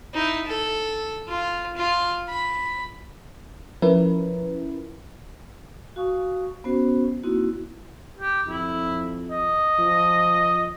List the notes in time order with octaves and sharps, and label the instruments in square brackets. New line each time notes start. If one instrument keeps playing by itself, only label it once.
[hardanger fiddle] D#4 E4
A4
F4
F4
B5
[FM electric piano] F3 C#4 E4 A#4 B4
[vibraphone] F#4 F5 G#5 C#6 D#6
B3 C#4 F#4 C5
A#3 C4 D#4 E4 F#4
[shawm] G4
[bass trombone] F2 [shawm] E4
[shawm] D#5
[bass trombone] F3